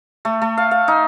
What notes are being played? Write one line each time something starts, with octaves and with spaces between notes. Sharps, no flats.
A3
A3
F5
F5
D#4